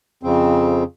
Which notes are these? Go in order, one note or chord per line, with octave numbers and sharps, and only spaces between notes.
F2 C#3 C4